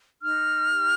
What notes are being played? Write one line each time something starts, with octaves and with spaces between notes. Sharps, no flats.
D#4 F6
G4